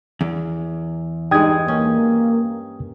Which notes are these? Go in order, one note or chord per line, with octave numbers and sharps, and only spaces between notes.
E2
G2 G#3 D#4 G5 D#6 G#6
A#3 C#4